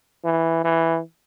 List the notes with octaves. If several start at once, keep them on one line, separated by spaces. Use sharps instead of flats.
E3
E3